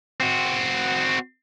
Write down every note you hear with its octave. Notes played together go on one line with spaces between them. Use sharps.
C4 F#4